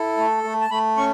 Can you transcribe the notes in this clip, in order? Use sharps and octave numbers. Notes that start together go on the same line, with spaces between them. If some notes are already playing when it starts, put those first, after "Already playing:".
Already playing: E4 A4
A3
A3
A5
A3 B5
C#4 C#6